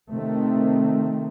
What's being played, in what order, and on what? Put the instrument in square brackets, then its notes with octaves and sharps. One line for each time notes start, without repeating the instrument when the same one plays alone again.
[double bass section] C3 D#3 A3 C4